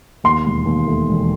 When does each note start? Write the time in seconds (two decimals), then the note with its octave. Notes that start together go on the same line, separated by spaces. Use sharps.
0.24 D#2 C6
0.46 E1
0.66 D#2
0.87 A3
1.09 E1